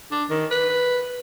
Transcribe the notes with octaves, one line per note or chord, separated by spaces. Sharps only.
D4
D#3
B4